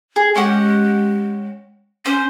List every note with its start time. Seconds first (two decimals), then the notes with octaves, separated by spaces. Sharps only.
0.16 G#4
0.36 G#3 C#4 G4 F#5
2.06 C#4 C5